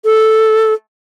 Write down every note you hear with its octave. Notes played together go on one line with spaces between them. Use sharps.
A4